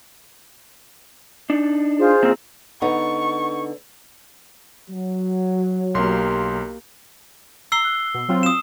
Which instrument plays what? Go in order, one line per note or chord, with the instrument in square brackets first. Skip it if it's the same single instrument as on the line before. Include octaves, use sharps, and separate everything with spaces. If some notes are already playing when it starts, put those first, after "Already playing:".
[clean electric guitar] D4 D#4
[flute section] F4 G#4 C5
[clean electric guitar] C#3 A#3 C4
[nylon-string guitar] D3 B3 D#4 [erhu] C#6
[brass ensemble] F#3
[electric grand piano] B1 C6 [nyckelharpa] A#3 G4
[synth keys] A#5 [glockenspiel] E6 C7 G7
[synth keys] F#6
B2
F#3 C4 F4
[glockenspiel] D#6 E7